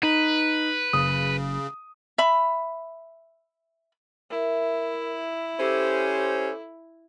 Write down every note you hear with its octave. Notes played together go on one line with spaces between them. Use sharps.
D#4 B4
F#1 C#3 D#6
E5 B5
E4 A#4 E5
C#4 G4 A4 C5 D6 E6